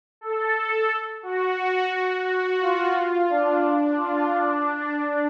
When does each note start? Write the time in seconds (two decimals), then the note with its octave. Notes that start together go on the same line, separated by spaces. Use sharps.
0.21 A4
1.23 F#4
2.26 F#4
2.61 F4
3.30 D4
3.97 F4
4.32 D4